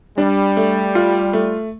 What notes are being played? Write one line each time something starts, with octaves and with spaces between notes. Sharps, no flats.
G3 D4
A3
F4
A3